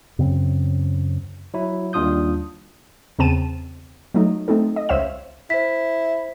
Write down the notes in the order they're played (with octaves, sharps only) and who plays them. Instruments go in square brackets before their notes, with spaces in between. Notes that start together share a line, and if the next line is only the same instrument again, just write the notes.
[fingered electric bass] F#2 C#3 C4
[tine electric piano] F#3 E4
D#2 G3 D4 F4 D#6 G6
[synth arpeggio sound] E2 C#3 C4 A5 D#7 E7
F#3 A3 D#4
A3 C4 D#4 A4
D#5
C#2 C5 C#5 E5 F5 E7
[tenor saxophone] E4 [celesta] C5 B6